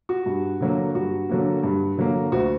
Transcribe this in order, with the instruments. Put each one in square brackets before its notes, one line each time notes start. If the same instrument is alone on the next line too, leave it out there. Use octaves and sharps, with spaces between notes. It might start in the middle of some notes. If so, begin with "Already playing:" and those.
[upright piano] F#4
G2
D3 F#3 A#3
G2 F#4
D3 F#3 A#3
G2
D3 F#3 A#3
D2 F#4